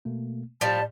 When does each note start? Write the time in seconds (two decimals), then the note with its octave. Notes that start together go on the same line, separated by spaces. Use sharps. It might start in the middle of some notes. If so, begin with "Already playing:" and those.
0.05 B2 A3 A#3
0.61 A2 F3 G3 A5